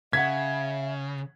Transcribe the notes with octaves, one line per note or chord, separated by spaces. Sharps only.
C#3 E5 F#5 G#6 B6